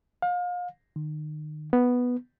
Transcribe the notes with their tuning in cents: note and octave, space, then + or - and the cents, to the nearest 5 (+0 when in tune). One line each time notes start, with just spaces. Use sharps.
F5 +35
D#3 -35
B3 +0